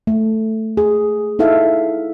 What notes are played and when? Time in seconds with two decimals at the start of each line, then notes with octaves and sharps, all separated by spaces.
0.07 A3
0.77 G#4
1.39 D#4 E4 A4 E5 F5